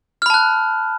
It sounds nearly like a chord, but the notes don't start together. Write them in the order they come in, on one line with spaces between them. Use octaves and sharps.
F6 B5 A5 F#6